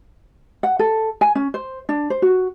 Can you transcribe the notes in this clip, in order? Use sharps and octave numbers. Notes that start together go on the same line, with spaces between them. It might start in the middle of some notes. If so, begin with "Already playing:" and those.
F#5
A4
G#5
C#4
C5
D4
C5
F#4